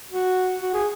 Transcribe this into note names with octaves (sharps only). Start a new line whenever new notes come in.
F#4
F#4
G#4